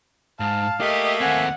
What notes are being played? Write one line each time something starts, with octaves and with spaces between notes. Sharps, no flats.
G#2 F5 A5
A3 A#3 G4 D#5 E5
D#2 C4 F#5 G#5